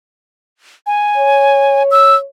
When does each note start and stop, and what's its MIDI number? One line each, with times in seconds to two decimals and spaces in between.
0.87 1.83 80
1.17 2.25 73
1.91 2.15 88